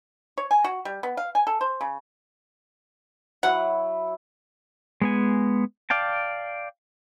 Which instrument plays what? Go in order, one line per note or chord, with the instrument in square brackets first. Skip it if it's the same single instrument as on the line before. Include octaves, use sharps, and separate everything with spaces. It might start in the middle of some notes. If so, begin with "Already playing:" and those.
[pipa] C#5
G#5
F#4
G3
B3
F5
G#5
A4
C5
C#3
[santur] F#3 E4 B5 [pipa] F#5
[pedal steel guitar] G#3 B3 G#5
D5 F5 G5 A5